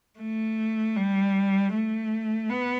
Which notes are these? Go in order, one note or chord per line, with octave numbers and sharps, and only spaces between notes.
A3
G3
A3
B3